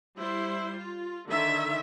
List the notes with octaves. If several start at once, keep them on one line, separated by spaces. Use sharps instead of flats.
G3 E4 C5
F4
D3 D#3 E5